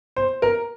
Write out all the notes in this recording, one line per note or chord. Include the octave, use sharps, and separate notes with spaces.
C5
A#4